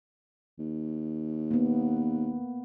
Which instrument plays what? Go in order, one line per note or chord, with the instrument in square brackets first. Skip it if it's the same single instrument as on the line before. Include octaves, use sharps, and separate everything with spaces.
[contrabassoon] D#2
[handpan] A#3 B3